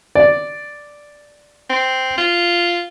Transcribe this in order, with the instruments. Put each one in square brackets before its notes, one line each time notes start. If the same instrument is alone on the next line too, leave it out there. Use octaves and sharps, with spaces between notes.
[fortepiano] D5
[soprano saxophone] C4
F4